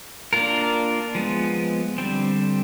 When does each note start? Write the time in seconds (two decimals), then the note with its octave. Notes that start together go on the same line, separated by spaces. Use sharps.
0.33 A#3 D4 F4 A#4
1.15 F3 G#3 B3
1.98 D3 G3 C4